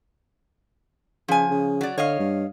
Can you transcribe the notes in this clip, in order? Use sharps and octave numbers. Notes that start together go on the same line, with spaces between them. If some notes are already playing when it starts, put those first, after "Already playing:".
C#3 F3 G#5
C#3
F#3 D5
D3 C#5 D#5 F5
G2